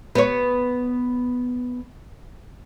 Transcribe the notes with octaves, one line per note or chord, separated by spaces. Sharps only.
B3 C#5